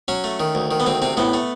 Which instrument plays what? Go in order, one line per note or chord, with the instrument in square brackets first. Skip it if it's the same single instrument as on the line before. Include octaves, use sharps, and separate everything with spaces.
[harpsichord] F#3 C#4
A3
D#3
D2
D#3
B3
D2 C4
C3 C4
A2 B3
A3